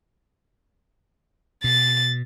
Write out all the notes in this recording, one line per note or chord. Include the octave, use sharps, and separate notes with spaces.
B2 A6